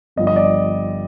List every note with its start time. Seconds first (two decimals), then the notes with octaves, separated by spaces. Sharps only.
0.16 G1 G2 F3 D#5
0.27 D#5
0.36 D5